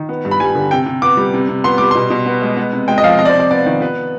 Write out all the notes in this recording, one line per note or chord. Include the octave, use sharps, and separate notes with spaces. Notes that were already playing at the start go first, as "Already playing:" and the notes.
Already playing: D#3
B3
G2
B5
G3 G#5
D3
C3 G5
C3
B3 D6
G3
C3
C3
B3 C6
G3 D6
B2 C6
B2
B3
G#3
B3
C3
G#3 G5
D#5
F3 F5
C3 D#5
D5
C5
C3
D5
B3 D5
D#3
B3 B4